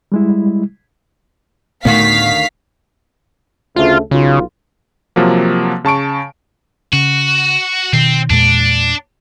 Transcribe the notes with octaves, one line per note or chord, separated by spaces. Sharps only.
G3 G#3 E4
D2 A2 D#3 A3 B3 F#4 F5 B6
D2 C#3 A3 F4
B1 C#3 F4
C3 F3 F#3 A#3
C#3 A5 C#6 D7
C#3 F#4
B2 D#3 C4
E2 A#2 G#3 D4